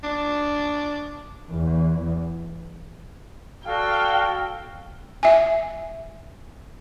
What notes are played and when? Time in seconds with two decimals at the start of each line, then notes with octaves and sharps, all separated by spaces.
0.03 D4
1.51 E2
3.66 F#4 A4 D5 F5 G5
5.23 E5 G#5